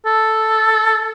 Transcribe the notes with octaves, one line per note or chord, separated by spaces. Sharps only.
A4